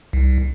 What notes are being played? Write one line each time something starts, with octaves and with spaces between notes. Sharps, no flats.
C2